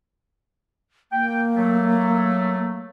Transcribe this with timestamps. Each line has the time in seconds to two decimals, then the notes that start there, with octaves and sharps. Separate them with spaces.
1.12 A#3 G5
1.56 F#3 A3